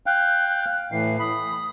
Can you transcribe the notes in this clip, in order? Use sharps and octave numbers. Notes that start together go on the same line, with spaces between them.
F5 G5 F#6
A2 E3 C7
B5 D#6